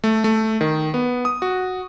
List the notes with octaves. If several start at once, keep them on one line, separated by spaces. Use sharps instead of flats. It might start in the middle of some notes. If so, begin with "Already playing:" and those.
A3
A3
D#3
B3
D#6
F#4